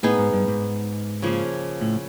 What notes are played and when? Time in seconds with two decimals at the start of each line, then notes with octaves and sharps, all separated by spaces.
0.03 A2 B3 D#4 G#4
0.18 G#2
0.33 G2
0.48 G#2
1.22 C#3 F3 A#3
1.82 A2